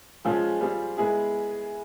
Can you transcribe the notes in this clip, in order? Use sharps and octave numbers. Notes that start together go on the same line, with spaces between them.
F3 G#3 C#4 F4 G#4
G3 C4 F4 G#4
G#3 B3 E4 G#4